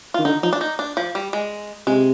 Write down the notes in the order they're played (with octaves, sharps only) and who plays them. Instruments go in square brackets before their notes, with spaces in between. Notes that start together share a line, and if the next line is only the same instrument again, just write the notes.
[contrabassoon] D#3 [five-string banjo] F4
[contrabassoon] D3 [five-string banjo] D#4
[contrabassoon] F3 [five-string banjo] D#4
[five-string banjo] D4
D#4
D4
F3
G3
G#3
[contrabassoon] C3 [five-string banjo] G#3